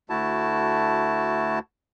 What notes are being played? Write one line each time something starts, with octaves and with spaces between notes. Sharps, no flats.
D2 A3 E4 F#4 A5